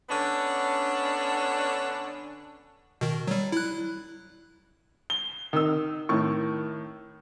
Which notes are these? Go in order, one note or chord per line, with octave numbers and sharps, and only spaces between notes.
D3 B3 C#4 D4
B2 D#3
F#3 G3
E4 F#6
G7
D#3 E6
A2 D#3 C#6